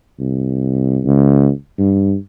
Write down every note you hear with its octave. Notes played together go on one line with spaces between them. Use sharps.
C2
C#2
G2